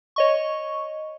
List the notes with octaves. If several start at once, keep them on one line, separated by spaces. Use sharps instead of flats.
C#5 D#5 C#6